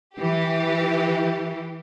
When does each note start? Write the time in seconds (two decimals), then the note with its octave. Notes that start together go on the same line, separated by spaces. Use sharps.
0.17 E3 G4